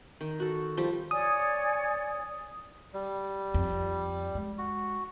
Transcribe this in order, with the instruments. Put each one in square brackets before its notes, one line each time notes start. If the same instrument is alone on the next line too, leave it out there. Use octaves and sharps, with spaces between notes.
[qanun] D#3
F#4 A4
F3 G3
[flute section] C#5 D5 G#5 [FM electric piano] D#6
[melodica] G3
[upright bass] F2
G#3
[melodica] F#4